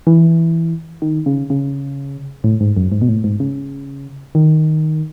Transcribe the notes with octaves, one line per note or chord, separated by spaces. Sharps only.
E3
D#3
C#3
C#3
A2
G#2
F#2
G#2
B2
A2
G#2
C#3
D#3